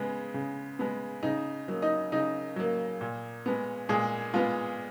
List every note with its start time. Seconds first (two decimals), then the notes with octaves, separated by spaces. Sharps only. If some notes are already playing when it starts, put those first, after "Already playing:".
Already playing: C#3 G#3 B3
0.34 C#3
0.79 G#3 B3
1.23 C#3 D#4 D#5
1.68 F#3 A#3
1.82 D#4 D#5
2.12 C#3 D#4 D#5
2.56 F#3 A#3
3.01 A#2
3.46 G#3 B3
3.89 A#2 G#3 G#4
4.34 G#3 B3 F4